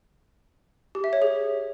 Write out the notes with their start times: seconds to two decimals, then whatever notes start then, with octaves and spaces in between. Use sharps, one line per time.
0.95 G4
1.04 E5
1.13 C#5
1.22 G#4